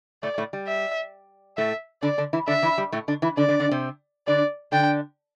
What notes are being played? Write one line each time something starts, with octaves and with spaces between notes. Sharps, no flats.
A2 A3 D5
A2 A3
G3
E5
A2 A3 E5
D3 D4 D5
D3 D4
E3 E4
D3 D4 E5
E3 E4
G3
A2 A3
D3 D4
E3 E4
D3 D4 D5
D3 D4
D3 D4
C3 C4
D3 D4 D5
D3 D4 G5